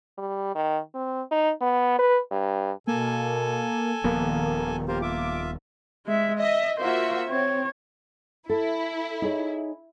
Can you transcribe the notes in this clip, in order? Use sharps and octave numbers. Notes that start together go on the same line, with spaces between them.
G3
D#3
C4
D#4
B3
B4
G2
B2 A#3 A4 G#5
D#1 D#3 F3 A#3 B3
A#3 F4 G4 A#4 C5
F4 E5 D6
G#3 E5
D#5 E5
A#3 F4 F#4 C5 E5
C4 C#5
E4 A4
D#4 G#4 C#5